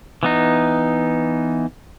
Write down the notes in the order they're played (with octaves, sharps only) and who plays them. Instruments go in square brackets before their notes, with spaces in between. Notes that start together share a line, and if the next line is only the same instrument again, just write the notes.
[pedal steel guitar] E3 B3 D#4